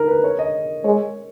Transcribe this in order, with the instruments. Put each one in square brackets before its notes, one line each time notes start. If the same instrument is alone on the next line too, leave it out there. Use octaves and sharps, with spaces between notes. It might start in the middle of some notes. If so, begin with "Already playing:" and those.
Already playing: [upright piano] D#4 A#4
B4
C#5
D#5
[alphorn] G#3 [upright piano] C#5